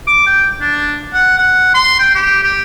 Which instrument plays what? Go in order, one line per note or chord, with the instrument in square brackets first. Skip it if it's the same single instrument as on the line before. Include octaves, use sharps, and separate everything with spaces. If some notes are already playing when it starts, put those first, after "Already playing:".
[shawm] D6
G5
D4
F#5
F#5
C6
G5
G4
G4